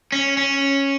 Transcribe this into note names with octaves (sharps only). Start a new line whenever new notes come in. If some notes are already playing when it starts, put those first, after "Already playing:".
C#4
C#4